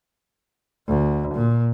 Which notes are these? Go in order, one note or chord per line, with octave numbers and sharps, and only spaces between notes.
D2
A#2